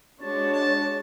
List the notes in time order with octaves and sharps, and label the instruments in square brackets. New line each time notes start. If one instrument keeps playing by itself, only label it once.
[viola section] G#3 D4 F#4 C#5 [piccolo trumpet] A5
[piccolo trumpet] A5